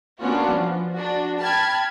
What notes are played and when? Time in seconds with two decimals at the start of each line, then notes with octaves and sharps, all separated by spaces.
0.20 A#3 B3 C#4 D4 F4 F#4
0.52 F3
0.90 D4 F#4
1.39 G5 A5 B5 F6 G#6